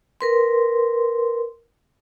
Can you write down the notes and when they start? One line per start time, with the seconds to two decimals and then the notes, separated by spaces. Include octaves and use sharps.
0.21 A#4 B4 C6